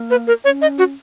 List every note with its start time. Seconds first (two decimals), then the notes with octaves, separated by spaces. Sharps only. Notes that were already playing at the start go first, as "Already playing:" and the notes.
Already playing: A#3
0.10 B4
0.27 A#4
0.45 C#4 C#5
0.62 D#5
0.78 F#4